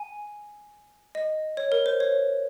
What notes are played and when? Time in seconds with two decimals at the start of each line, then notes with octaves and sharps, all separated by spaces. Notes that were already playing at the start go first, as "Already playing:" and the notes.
Already playing: G#5
1.15 D#5
1.57 C#5
1.72 A#4
1.86 C5
2.00 C#5